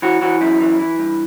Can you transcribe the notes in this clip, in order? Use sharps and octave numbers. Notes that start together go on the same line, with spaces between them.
E3 F#4
E3 F#4
F#2 E4
E3
E3
G2